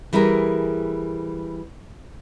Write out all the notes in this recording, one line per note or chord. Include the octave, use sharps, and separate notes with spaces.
E3 G3 E4 G#4 A#4